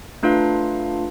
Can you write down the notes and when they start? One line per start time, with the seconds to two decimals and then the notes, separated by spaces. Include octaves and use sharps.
0.23 A3 D4 F4 B4 F5